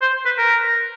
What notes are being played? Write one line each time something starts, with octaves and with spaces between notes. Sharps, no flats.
C5
B4
A#4